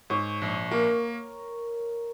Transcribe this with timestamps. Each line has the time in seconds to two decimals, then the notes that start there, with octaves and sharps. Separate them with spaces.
0.10 G#2 C#5
0.42 A#1
0.71 A#3 A#4